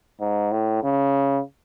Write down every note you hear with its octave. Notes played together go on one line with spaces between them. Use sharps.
G#2
A2
C#3